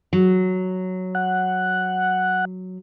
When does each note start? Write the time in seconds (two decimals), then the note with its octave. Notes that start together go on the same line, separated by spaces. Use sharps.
0.13 F#3
1.15 F#5